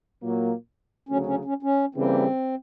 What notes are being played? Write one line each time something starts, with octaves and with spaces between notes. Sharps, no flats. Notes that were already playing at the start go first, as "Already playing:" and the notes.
A#2 F#3 A#3
D2 C#3 F#3 C#4
C#4
C#4
C#4
C#3 E3 G3 A#3 C4